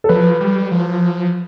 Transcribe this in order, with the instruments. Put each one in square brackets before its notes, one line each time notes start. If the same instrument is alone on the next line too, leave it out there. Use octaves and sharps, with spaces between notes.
[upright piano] A4
[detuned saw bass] F3 [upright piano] B4
[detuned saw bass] G3
F3